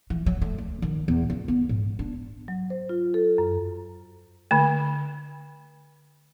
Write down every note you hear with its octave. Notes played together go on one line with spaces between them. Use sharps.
E3
F#3
A3
D2
D#3
E2
C#2
B3
G#2
D4
F#3
C5
F4
A4
F#2
D3 A3